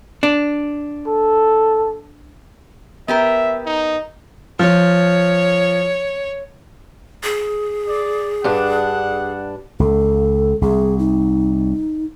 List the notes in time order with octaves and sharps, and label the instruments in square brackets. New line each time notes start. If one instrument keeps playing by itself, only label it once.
[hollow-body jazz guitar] D4
[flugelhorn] A4
[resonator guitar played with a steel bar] B3 G4 A#4 [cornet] E5
[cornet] D#4
[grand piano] F3 [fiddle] C#5
[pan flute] G#4
[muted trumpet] D5
[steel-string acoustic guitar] G2 D4 [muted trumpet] F#5
[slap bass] C#2 [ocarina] A4
[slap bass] C2 [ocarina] G#4
[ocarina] D#4